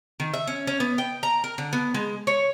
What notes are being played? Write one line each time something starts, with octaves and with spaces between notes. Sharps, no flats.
D#3
E5
C#4
C#4
B3
G5
A#5
A#4
D3
B3
G#3
C#5